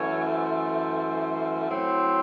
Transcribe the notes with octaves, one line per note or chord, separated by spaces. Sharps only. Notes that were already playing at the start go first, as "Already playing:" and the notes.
Already playing: F#2 E3 A3 C#5
C5
A2 F#3 C4